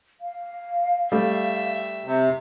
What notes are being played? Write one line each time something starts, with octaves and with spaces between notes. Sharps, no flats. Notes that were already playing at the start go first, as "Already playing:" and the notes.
F5
G3 A3 E5
C3